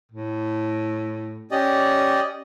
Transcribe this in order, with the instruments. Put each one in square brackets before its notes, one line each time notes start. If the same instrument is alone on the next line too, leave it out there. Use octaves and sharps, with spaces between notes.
[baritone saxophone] A2
[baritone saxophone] C#4 [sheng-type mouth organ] G4 D5 D#5